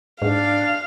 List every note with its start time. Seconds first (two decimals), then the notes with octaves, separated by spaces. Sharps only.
0.22 G#2 D4 F5